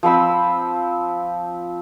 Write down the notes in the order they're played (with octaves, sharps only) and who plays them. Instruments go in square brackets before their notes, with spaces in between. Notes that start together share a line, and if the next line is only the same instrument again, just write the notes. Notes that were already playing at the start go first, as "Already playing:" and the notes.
[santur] F3 C4 B5 E6